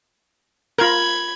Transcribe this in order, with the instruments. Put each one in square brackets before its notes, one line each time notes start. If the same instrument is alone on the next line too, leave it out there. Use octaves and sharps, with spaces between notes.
[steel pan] F4 A#4 [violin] B5 G#6